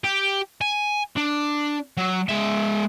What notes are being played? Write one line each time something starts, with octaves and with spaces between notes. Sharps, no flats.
G4
G#5
D4
F#3
G#3 E5